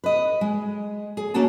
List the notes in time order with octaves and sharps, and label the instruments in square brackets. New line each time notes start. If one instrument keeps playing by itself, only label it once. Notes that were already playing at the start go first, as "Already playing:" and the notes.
[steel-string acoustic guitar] B4 D#5
G#3
G#4
D2 A3 A#3 C#4 F#4 A5